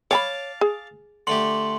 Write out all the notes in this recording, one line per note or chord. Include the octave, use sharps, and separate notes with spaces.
C#5 F5 G#5 A5 B5 D6
G#4
D3 A3 G4 C6 F#7